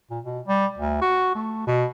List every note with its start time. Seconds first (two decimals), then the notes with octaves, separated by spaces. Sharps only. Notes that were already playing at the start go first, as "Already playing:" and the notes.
0.11 A#2
0.24 B2
0.47 G3
0.78 D2
1.01 F#4
1.35 A3
1.67 B2